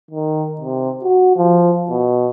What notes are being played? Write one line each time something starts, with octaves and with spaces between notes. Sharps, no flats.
D#3
C3
F#4
F3
B2